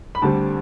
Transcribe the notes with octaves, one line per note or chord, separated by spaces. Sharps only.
B5
D2 D3 G3 C4 A5